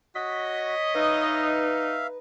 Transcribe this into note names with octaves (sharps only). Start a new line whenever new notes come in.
F#4 C#5 D#5 B6
D#4 B4 E5 F5